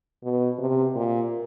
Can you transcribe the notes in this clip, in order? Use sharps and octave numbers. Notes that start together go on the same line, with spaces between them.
B2
C3
A#2